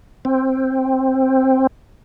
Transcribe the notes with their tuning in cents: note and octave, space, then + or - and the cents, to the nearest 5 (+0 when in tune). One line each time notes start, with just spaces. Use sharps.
C4 +10